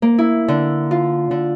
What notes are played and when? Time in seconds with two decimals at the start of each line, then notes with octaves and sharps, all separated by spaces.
0.02 A#3
0.18 E4
0.48 D3
0.91 F4
1.31 D3